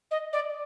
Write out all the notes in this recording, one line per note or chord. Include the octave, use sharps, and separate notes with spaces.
D#5
D5